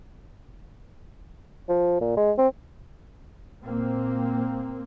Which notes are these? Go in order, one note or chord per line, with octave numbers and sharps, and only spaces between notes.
F3
A#2
G#3
C4
A#2 A#3 C4